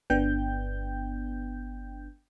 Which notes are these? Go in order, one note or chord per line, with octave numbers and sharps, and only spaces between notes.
G1 B3 D4 G5 G6